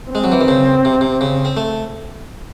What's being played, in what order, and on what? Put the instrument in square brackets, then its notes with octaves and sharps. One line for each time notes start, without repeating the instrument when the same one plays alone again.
[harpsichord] G#3 [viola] C4
[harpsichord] F#3
E3
D#3
C#3
C3
C3
C#3
C4
A3